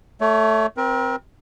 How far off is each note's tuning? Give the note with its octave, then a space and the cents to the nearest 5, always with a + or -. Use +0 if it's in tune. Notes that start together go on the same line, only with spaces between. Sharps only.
A3 +0 C#5 +30
C4 +0 A#4 +35